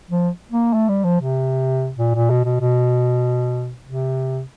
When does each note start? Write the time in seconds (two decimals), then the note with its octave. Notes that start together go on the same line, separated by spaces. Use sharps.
0.11 F3
0.52 A#3
0.73 A3
0.89 G3
1.04 F3
1.21 C3
1.98 A#2
2.15 A#2
2.30 B2
2.45 B2
2.61 B2
3.86 C3